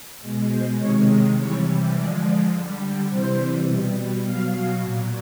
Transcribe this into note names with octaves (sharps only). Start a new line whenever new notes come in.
B2 G#3
C5
C3 D#3 G#3 C#5
C3 E3 G3 C#5
D3 F3 G#3 D5
D5
D3 G3
C3 E3 G3 C5
B2 G3
B2 F#3 F5
A#2 F#3